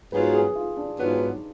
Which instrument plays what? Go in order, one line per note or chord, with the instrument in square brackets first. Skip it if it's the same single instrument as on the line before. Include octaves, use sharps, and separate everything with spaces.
[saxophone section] G#2 F#3 B3 F4 [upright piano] B4
[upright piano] G#4
F4
D4
[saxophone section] G#2 F#3 B3 F4 [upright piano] D#4